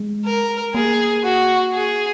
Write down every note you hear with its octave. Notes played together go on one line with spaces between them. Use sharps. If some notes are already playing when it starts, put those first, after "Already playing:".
Already playing: G#3
A#4
A#3 G#4
F#4
G#4